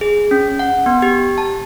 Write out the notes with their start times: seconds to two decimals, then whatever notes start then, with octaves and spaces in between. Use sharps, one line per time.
0.01 G#4
0.31 C#4
0.59 F#5
0.86 B3
1.02 G4
1.38 A5